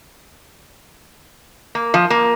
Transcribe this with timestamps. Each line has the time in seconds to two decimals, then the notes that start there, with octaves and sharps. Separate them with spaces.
1.75 A#3
1.94 F3
2.10 A#3